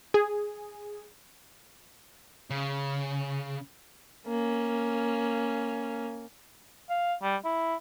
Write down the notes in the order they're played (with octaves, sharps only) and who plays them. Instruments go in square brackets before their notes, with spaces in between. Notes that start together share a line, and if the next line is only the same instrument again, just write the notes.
[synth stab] G#4
[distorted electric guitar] C#3
[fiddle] A#3 C#4
[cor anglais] F5
G3
E4